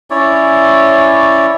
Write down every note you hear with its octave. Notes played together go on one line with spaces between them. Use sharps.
C#4 E4 C#5 D5